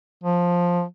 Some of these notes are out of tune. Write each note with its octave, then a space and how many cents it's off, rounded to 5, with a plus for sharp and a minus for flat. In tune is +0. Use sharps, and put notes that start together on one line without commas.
F3 +10